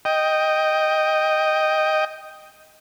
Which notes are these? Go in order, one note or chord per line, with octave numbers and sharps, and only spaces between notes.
D#5 G5